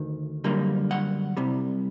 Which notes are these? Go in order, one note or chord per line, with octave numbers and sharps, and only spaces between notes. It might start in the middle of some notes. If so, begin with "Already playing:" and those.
Already playing: D2 D#3
F#2 D3 G3 A#3
F#5
C2 C3 G3